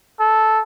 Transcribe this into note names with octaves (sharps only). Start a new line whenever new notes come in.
A4